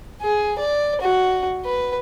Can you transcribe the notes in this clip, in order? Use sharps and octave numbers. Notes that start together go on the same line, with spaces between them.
G#4
D5
F#4
B4